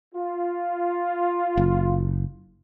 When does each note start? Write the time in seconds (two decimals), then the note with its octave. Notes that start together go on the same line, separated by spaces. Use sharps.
0.14 F4
1.57 F#1